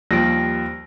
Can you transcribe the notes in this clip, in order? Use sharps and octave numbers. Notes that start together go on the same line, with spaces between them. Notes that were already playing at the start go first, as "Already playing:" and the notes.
D#2 F3 G3 A#6 D7